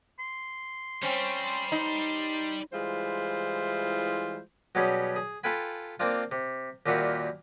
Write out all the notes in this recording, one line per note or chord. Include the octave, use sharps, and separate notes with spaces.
C6
G3 C4 C#4
D#4
E3 G3 G#3 E4 F4 C5
B2 F#3 G3 C#4 G#4
G#4
F4 A4 B4 G5 G#5 B5
A#3 C4 D4 F4
C3
D#2 A#2 G3 F4 F#4 E5